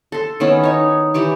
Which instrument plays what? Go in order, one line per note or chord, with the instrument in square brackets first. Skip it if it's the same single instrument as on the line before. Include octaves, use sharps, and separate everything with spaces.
[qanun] A4 C6
D#3 B3 C#4 E4
D#4 C#5
E3 G4 C#6